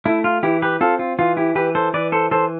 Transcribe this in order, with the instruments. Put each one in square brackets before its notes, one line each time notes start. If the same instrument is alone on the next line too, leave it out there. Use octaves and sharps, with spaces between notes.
[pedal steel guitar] A3 E4
F4
E3 E4 G4
G4 B4
C4 F4 A4
F4
E3 F4
E4 G4
E3 G4 B4
A4 C5
E3 B4 D5
A4 C5
E3 A4 C5